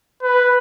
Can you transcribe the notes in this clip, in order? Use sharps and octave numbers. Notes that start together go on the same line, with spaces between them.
B4